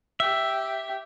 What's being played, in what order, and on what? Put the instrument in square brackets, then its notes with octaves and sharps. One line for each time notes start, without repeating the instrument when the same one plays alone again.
[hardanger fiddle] G4 [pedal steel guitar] E5